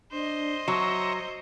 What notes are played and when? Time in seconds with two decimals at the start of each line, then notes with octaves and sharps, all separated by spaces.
0.12 D4 C5 D#5
0.68 F#3 C#5 E5 A#5 C6